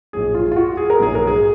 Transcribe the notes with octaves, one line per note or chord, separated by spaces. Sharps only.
A#1 G#2 F#3 G#4
F4
F4
F#4
G#4
A#4
A#1 G#2 F#3 G#4
A#4
G#4